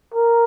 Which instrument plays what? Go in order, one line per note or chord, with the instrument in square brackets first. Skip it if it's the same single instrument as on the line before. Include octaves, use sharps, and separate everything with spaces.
[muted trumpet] A#4